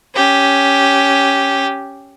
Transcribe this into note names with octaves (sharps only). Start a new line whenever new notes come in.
C#4 G4